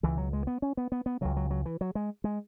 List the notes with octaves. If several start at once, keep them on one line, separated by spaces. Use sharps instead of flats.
C#2 B2 E3
F#3
G#3
B3
C#4
B3
B3
B3
C#2 C#3 F#3
F#3
F#3
E3
F#3
G#3
G#3